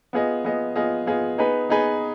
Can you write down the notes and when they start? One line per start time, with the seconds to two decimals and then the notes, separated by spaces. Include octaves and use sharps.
0.13 B3 F4 G#4 D#5
0.44 B3 F4 G#4 D#5
0.76 B3 F4 G#4 D#5
1.06 B3 F4 G#4 D#5
1.38 B3 D#4 G#4 B4
1.69 B3 D#4 G#4 B4